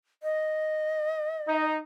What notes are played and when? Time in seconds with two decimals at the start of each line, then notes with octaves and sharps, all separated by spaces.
0.23 D#5
1.48 D#4